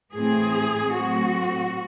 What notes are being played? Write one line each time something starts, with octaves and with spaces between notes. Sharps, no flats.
A2 E3 A3 C4 G#4
A2 F#3 A3 C4 F#4